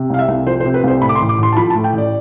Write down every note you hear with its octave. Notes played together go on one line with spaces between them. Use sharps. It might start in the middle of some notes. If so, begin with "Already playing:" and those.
Already playing: C3
C2 F5
E5
C2
F3 C5
C5
C3
B4
C2 C5
A2 B5
D6
C6
A1
D6
A1 C6
A5
F3 B5
A5
A2
G5
A1 D5